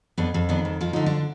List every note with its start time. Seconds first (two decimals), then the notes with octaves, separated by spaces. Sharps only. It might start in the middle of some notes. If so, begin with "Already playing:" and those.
0.18 F2 B3 D4
0.34 F2
0.49 D#3 B3 D4
0.65 F2
0.81 F3 F4
0.93 D3 D#4
1.06 D4